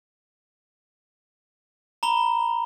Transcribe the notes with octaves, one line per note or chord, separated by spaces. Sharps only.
A#5 B5 G7